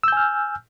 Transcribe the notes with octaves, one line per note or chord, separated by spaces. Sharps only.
G#5 E6 F6 G6